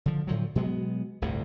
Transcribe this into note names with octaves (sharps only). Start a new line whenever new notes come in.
D3 F3
A2 D3 F3 F#3
B2 F#3 G#3 B3
G1 D2 A2 C3